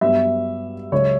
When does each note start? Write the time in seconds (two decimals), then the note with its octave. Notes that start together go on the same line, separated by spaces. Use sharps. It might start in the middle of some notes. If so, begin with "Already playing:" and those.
0.01 G2 F#3 B3 E5
0.92 C#2 C#3 F#3 C#5